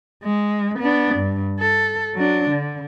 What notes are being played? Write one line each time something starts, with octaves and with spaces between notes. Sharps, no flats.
G#3
B3 D4
G2
A4
F#3 D4
D3